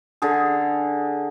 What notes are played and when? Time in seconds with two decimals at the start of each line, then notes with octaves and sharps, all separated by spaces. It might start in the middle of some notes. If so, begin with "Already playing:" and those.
0.22 D3 G#4